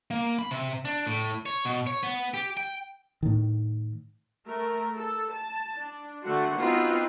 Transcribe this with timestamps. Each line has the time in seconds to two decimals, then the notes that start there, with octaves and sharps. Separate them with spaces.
0.11 A#3
0.39 B5
0.51 C3
0.85 D4
1.07 A2
1.46 C#5
1.65 B2
1.87 C#5
2.03 B3
2.34 G4
2.57 G5
3.23 A2 D#3
4.46 A3 A#4
4.96 A4
5.32 A5
5.75 D4
6.24 D3 A3 F#4 F#5 C6
6.57 B3 C4 D#4 F4 F#4 B4